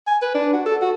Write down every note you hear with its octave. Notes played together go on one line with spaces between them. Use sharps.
G#5
B4
D4
F#4
A4
F#4